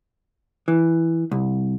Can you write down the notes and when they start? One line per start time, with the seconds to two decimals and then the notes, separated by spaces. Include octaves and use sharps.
0.68 E3
1.31 C2